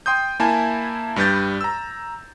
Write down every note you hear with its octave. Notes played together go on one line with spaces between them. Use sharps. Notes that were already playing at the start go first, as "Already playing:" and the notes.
G5 C6 D#6 G6
A#3 E4 E5 G#5 A5
G2 G3 B4 G6 A6
A#5 E6